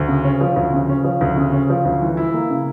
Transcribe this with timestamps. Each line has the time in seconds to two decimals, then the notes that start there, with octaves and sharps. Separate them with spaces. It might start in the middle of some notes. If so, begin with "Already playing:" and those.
Already playing: D2
0.08 C#3
0.24 C#4
0.41 F3
0.56 D2
0.73 C#3
0.89 C#4
1.04 F3
1.21 D2
1.37 C#3
1.53 C#4
1.70 F3
1.85 D2
2.02 E3
2.17 E4
2.34 A#3
2.50 C#3